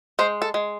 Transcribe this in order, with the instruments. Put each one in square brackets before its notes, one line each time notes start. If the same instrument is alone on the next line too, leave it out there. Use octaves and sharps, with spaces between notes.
[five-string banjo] G#3 C5
A4
G#3